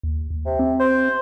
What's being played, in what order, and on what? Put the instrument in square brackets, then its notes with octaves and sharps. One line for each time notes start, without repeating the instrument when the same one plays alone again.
[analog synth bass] D#2
D#2
[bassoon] C3
[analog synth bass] C4
[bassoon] C5